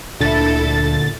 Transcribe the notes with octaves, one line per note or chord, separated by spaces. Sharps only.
D2 A#2 D3 E4 A4 A6